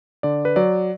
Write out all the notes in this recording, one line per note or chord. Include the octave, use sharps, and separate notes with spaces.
D3 D5
B4
F#3 D5